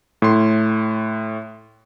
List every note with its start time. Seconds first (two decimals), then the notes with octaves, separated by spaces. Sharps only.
0.22 A2 C6